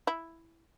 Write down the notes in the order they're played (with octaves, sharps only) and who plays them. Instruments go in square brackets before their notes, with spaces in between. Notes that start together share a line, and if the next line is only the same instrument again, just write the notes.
[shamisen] E4